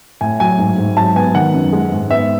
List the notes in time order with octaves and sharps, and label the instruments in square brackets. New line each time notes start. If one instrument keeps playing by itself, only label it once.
[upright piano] A2 G#5
F#3 G#5
G#2
G#2
F#3 A5
B3 G#5
D#3 F#5
F#2
G#3
G#2
B3 E5